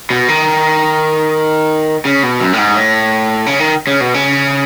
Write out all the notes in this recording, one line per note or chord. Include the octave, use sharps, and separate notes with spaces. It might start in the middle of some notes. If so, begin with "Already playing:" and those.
B2
D#3
C#3
B2
F#2
A2
G#2
A2
C#3
D#3
C#3
B2
C#3